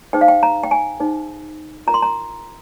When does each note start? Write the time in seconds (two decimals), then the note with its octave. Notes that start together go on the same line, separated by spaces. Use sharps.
0.13 D#4 G#4 C5 G5
0.21 F5
0.28 G5
0.43 A#5
0.64 G5
0.71 G#5
1.00 D#4 G#4 C5
1.87 F4 A#4 A#5
1.94 C6
2.02 A#5